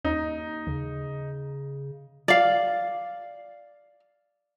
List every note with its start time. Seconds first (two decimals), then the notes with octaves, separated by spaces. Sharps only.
0.04 D#2 D#4
0.67 C#3
2.28 D5 F5